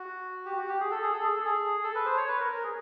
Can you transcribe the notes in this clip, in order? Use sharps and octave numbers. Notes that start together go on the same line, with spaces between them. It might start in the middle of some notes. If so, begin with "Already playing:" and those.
Already playing: F#4
G4
F#4
G4
G#4
A4
G#4
A4
G#4
A4
G#4
A4
B4
C5
C#5
B4
A#4
A#4
G#4